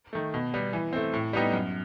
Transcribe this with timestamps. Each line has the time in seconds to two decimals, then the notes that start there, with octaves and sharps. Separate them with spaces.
0.13 D#3 A3
0.34 B2
0.54 G3 B3
0.73 E3
0.93 A3 C4
1.14 A2
1.33 G3 B3 D#4 G4
1.53 F#2